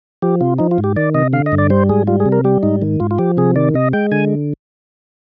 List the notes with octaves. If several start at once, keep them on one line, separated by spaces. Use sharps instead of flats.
F3 G4
C3 F4
F3 D#4
F4
G#2
G4
D#3 D5
C3 D#5
D3 F5
D#5
G2
D5
G3 C5
G#2 G#4
G3 F4
G#4
C3
A#4
G3 G4
G#2 D#4
D#3
G#2 F4
F4
F3 G4
C3 G#4
D#3 D5
C3 D#5
G#3 G5
D3 G#5